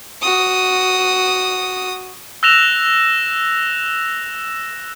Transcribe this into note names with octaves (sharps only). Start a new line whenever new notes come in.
F#4 D#6
E6 F#6 A#6 E7 F7